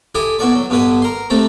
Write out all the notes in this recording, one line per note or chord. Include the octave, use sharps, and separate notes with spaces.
E4 G4 A4 D#5 G#5
B2 E4 F#4 A4 D5 C#6
F#3
G2 B2 D3 B4 F#5 G#5
A#4 C6
C3 A3 C4 A4 A#5